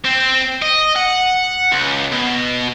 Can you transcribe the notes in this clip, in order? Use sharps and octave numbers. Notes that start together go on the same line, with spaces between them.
C4
D#5
F#5
C#2
B2